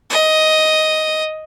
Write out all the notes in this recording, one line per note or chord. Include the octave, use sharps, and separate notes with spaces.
D#5